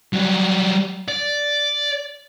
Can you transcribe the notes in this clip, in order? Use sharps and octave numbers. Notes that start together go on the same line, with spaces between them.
F#3 G3
D5